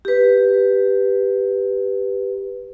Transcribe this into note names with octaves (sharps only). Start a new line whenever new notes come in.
G4 B4